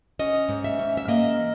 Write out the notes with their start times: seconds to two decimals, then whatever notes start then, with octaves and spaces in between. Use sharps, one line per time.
0.19 C#4 D#5
0.49 G#2
0.64 E5
0.79 C#4
0.97 E5
1.08 A#3 D#5
1.39 E3